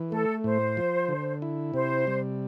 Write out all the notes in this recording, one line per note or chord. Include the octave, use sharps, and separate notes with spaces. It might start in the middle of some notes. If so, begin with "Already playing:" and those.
Already playing: E3
A3 A4
A2 C5
F3
D3
E4
C3 C5
G3